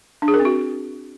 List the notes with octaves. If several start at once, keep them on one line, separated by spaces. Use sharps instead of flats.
D4
G#4
A#4
C4
F#4